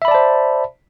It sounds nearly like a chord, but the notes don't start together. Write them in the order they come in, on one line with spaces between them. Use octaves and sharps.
E5 B5 D5 A5 C5